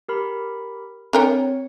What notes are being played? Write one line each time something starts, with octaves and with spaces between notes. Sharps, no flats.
G4 A#4 B5
D3 C4 A#4 C#5 G5 C#7